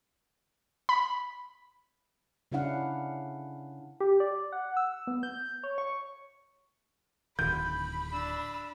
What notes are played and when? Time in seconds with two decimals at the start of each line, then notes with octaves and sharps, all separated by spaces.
0.89 B5
2.52 C#3 C#4 D4 E4 F5 F#5
4.00 G4
4.20 D5
4.52 F#5
4.77 E6
5.07 B3
5.23 G6
5.63 C#5
5.78 C#6
7.39 D1 D#3 B5 G6
8.11 D4 E6